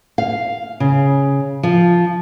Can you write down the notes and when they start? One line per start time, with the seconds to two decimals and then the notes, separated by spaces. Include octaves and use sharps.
0.18 F5
0.80 C#3
1.63 F3